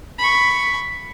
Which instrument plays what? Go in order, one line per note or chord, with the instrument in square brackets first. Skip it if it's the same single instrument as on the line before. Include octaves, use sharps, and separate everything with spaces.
[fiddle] B5 C#6